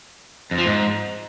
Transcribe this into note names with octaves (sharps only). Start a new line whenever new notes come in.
F2
F3
G#2